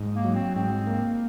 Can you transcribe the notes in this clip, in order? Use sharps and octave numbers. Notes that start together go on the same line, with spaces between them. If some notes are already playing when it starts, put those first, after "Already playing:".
Already playing: G#2
A#3
F#3
C4
G#2 C4
A#3